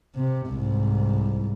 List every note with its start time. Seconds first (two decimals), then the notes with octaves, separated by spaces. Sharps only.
0.15 C3
0.48 C2 G#2